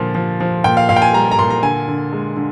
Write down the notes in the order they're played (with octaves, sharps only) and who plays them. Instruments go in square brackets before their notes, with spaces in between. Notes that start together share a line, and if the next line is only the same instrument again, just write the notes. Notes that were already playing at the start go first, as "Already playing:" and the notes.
Already playing: [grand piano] A#2 D3 F3
F3
F3
A#2 G5
F5
A#2 F5
G5
G#5
G3 A#5
A#5
A#2 C6
A#5
D3 G#5
D3
G#3
D3